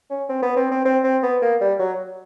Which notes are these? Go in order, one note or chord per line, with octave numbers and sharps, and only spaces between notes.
C#4
C4
B3
C4
C4
C4
C4
B3
A#3
G3
F#3